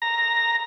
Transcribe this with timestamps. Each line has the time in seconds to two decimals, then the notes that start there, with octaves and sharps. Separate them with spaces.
0.02 A#5